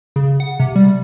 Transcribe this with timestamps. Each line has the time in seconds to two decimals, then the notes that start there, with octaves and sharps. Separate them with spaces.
0.16 C#3
0.40 F#5
0.60 C3
0.76 G3